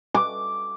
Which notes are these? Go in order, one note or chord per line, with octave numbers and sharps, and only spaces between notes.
D6